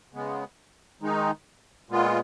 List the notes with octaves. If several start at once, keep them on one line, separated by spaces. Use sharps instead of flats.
C#3 G#3 B3
D#3 G#3 D#4
A#2 G#3 B3 F4